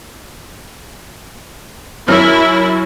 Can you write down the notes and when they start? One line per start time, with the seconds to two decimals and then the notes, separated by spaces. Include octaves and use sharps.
2.08 F#2 C#4 E4 F6